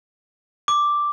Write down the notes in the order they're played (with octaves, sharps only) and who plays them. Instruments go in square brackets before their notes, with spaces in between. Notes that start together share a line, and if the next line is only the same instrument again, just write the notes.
[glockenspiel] D6